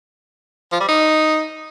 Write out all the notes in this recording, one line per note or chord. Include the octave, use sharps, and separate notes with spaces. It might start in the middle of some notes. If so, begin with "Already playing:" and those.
F3
G3
D#4